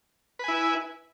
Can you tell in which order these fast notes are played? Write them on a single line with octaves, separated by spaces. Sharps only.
B4 G#5 E4